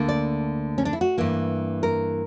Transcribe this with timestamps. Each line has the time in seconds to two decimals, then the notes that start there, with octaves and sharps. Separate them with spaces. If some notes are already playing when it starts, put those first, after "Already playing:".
Already playing: D2 D3 A#3
0.09 D5
0.78 C#4
0.85 D4
0.93 E4
1.01 F#4
1.18 G2 E3 A#3
1.83 A#4